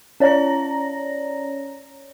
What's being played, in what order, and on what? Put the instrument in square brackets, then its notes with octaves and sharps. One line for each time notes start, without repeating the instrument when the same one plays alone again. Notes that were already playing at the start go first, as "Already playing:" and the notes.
[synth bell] C#4 C#5 D5 A#5 A#6